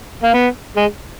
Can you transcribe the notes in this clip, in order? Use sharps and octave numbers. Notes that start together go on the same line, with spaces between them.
A#3
B3
G#3